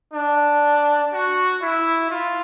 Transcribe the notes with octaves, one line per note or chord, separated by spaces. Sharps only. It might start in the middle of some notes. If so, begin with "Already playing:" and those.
D4
F#4
E4
F4